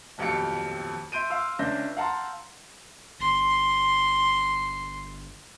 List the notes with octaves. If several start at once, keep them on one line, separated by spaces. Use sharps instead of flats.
D#1 B1 F2 G4 F5 C#7
E5 C6 G6 D7 D#7
F5 C6 E6
C#2 C#4 D4 E5 G6 A#6
F5 F#5 A5 A#5 C6
G1 C6